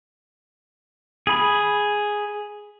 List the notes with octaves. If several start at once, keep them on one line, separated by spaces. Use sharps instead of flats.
G#4 B5